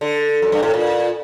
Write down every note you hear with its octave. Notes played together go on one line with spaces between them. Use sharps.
D3
F#2
G2
A2
A#2